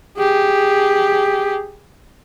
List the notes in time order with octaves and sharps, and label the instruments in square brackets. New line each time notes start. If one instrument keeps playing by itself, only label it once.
[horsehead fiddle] G4 G#4